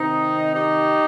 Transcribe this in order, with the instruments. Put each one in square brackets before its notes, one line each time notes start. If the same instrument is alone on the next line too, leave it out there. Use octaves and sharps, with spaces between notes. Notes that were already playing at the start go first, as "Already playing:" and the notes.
Already playing: [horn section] C3 D#3 C4 D#4
D#4 G4